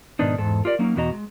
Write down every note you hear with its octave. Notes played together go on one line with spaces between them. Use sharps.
G#2 B2 D#3 B3 D4 D#4
E2 G#2 A4
F4 G4 A#4 D5
F#3 A#3 C#4 D#4
E2 B2 F#4 D#5 A#5
G#3